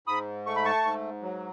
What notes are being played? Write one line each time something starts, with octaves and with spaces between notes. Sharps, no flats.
G#2 B5 D#6
A3 C#6
B5
A5 C#6
G#2
F#3